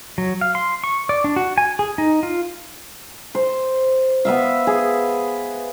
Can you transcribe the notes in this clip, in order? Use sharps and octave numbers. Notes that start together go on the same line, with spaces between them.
F#3
F5
C6
C#6
D5
D4
F#4
G#5
G#4
D#4
F4
C5
B3 B4 E5 F5
G#4